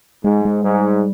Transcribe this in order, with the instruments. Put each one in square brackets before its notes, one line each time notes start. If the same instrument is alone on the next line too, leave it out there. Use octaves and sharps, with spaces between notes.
[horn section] G#2 [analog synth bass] G#3
[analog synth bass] G#3
[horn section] G#2 [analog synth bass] G3